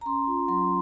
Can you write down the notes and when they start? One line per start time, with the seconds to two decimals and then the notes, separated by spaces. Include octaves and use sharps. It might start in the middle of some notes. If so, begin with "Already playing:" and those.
0.01 A#5
0.06 C#4 C6
0.27 F4
0.48 F#3 C6